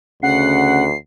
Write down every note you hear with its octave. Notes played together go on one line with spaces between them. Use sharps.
D2 C#3 F#5 C7